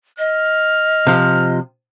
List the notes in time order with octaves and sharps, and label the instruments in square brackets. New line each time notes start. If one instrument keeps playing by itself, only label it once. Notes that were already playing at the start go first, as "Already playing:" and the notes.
[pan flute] D#5 [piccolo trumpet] F6
[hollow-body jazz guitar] C3 F3